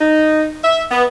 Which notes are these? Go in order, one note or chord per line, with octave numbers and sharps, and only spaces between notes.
D#4
E5
B3